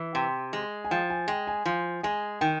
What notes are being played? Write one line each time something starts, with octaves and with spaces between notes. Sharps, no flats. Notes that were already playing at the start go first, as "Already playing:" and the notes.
Already playing: E3
C3 G5
G#3
G#5
F3 G5
G#5
G#3 G5
G#5
F3 G#5
G#3 G#5
D#3 G5